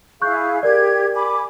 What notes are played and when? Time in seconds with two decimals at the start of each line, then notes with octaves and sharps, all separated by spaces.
0.22 E4 G#4 F5 C#6 F#6 G6
0.63 G4 A#4 D5 G#6
1.15 G#5 B5 D6